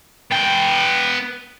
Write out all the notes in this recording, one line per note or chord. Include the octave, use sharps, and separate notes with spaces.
B3 G5